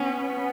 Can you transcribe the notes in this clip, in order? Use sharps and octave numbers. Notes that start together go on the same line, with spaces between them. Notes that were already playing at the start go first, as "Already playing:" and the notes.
Already playing: B3 C#4